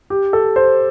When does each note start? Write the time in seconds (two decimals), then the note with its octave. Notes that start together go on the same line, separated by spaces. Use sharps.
0.10 G4
0.33 A4
0.56 C5